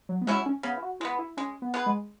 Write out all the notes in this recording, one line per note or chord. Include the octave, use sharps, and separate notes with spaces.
F#3
B3
F#3 G#3 C#4 E4
C#4
C#3 B3
E4
F#4
G#3 B3 E4
E4
G#3 C#4
B3
B3 G#4 B4
G#3